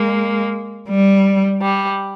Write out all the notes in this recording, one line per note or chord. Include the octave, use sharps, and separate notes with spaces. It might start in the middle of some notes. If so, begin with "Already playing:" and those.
Already playing: G#3 A#3
G3
G3